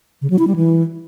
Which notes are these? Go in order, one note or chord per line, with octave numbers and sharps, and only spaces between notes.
C#3
F#3
E4
G3
E3